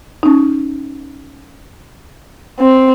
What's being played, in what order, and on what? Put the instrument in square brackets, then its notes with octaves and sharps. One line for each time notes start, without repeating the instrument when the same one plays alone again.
[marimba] C#4 D#4
[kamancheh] C4